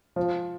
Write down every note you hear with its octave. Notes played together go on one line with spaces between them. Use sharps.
F3